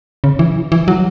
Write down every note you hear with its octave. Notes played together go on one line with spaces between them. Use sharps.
C#3
E3
E3
F#3